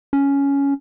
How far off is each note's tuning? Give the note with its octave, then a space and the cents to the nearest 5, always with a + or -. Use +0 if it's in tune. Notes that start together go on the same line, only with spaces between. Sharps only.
C#4 +10